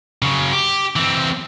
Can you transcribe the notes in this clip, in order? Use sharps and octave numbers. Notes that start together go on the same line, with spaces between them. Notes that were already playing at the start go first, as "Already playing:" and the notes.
C#3 F#3
G4
E3 C4